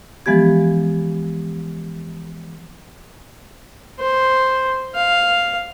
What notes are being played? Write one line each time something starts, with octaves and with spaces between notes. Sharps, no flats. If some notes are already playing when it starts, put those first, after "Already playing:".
E3 F3 G#3 B3 G4 G#6
C5
F5